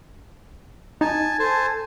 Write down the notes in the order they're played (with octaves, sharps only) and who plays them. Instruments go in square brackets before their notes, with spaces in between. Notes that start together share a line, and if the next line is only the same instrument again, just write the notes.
[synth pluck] D#4 [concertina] G#5 A5
[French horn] A4 [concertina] C5 G#5 A5